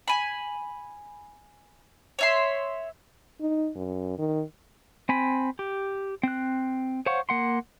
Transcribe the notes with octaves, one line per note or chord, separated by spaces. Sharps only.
G#5 B5
C#5 E5 C6
D#4
F#2
D#3
C4 G#5 B5
G4
C4 F#6
C5 C#5 F5 F#5 C#6
A#3 F#5 C6